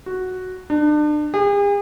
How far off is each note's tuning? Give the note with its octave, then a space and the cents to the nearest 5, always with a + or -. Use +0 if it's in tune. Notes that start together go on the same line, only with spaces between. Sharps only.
F#4 +0
D4 +35
G#4 -45